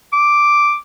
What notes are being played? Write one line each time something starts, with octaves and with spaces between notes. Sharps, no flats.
D6